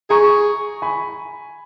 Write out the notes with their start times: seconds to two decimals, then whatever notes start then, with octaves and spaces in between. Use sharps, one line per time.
0.10 G#4 A#5 C#6
0.82 G#5 B5